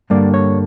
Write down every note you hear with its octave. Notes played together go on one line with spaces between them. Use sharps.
G2 D3 G3 A#3 D5
C#5